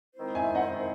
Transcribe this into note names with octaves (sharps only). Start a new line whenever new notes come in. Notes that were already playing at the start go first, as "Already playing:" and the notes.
D#3 G#3 C4 E4 C5
E5 G#5
D#5 F#5